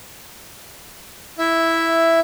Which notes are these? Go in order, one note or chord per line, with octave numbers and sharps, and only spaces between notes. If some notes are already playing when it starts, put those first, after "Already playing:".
E4 E5